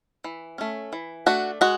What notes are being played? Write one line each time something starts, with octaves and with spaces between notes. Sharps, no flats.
E3
A3 C#4
E3
A3 D4 F#4
G#3 F#4